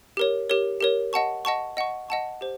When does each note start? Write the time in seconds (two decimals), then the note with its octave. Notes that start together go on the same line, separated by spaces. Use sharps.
0.17 G4 A#4 C#5
0.49 G4 A#4 C#5
0.80 G4 A#4 C#5
1.13 D#5 F#5 A5 C#6
1.45 D#5 F#5 A5 C#6
1.77 D#5 F#5 A5 C#6
2.08 D#5 F#5 A5 C#6
2.41 G4 C5